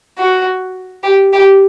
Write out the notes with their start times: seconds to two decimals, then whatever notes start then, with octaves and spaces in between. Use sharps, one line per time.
0.18 F#4
1.03 G4
1.33 G4